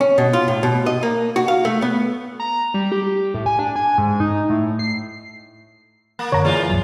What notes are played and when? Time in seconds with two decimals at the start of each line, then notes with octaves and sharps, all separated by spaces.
0.01 C#4
0.18 B2
0.33 F4
0.48 A2
0.63 B2
0.86 D#5
1.03 A#3
1.36 F#4
1.48 F5
1.65 A3
1.82 B3
2.40 A#5
2.74 G3
2.92 G4
3.34 A2
3.46 G#5
3.59 D4
3.76 G#5
3.98 G#2
4.20 D#4
4.50 A2
4.79 C7
6.19 A#3 B5 A6 A#6
6.32 F#2 D3 C#5 A#5
6.45 E3 A#3 F4 G#4 D5
6.69 C#2 G2 F#3